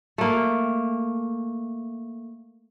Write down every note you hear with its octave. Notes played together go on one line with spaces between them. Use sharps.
A3 A#3